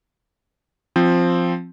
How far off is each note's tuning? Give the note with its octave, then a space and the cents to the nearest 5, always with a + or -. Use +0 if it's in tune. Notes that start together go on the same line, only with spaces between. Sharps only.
F3 +0 C4 +0